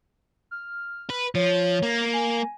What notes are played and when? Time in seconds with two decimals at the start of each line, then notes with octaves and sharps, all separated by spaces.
0.51 F6
1.10 B4
1.35 F3 C#5
1.83 A#3
2.13 G#5